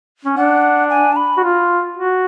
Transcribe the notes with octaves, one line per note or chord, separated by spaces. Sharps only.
C#4
D4 F#5
G#5
A5
B5
F#4
F4
F#4